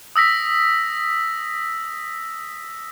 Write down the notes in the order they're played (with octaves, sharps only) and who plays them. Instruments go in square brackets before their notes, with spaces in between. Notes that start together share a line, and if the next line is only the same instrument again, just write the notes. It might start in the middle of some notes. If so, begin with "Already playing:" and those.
[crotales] D#6 E6 A#6 B6